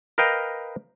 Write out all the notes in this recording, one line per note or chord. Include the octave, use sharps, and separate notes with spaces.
A#4 B4 D#5 F5 G5